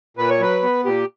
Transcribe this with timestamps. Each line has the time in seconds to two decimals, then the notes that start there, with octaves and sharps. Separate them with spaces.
0.17 A#2 B4
0.30 C#5
0.40 F#3 B4
0.63 B3
0.85 A#2 G4